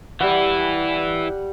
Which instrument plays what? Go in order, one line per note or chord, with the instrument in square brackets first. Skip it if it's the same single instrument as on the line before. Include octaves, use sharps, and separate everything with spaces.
[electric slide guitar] E3 E4 [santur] G3 F#5